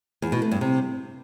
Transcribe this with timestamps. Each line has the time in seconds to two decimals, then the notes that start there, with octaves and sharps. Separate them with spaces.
0.22 E2
0.32 B2
0.42 A3
0.51 G2
0.61 C3